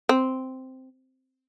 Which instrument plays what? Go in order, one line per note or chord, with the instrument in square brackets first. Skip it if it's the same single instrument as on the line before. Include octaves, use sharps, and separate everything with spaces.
[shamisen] C4